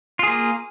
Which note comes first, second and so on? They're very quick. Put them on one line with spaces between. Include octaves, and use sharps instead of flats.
F4 G#4 A#3